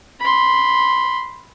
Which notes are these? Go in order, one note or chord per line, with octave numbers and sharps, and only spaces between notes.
B5 C6